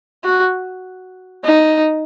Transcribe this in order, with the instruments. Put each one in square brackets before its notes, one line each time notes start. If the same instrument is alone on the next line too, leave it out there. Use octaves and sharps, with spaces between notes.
[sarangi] F#4
D#4